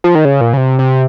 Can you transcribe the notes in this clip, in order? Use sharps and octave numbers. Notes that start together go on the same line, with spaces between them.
F3
D#3
C#3
A#2
C#3
C3
C3